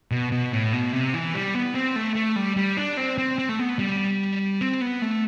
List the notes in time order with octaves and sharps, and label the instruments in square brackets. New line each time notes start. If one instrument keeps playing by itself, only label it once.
[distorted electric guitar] B2
B2
A2
B2
C3
E3
G3
B3
C4
A3
A3
G3
G3
D4
C4
C4
C4
A3
B3
G3
C4
B3
A3